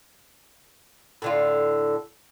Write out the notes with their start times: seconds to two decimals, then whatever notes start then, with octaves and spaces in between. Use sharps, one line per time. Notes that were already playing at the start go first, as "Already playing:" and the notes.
1.22 A2 D3 F4